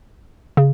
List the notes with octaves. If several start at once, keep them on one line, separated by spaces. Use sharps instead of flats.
C#3